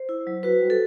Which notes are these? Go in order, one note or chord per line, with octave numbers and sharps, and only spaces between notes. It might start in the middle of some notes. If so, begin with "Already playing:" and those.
Already playing: C5
E4
F#3
F#4 B4
G3
A4